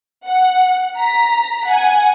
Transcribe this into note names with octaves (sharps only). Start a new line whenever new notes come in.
F#5
A#5 B6
F#5 G#5